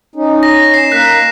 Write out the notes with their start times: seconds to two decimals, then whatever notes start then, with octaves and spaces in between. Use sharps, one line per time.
0.16 C#4 D#4
0.43 A#6
0.74 C7 E7
0.92 A#3 A#4 F#6 B6